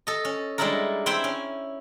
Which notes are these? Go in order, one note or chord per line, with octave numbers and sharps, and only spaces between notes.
A4 D#5
C#4
G3 G#3 D4 E4 A4 A#4
C4 E4 C5 E5 G5 G#5
C#4